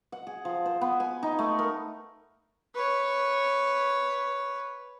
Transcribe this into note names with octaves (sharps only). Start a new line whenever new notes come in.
F#5
G#4
F3
C5
B3
G#5
D#4
A3
A#4
B4 C#5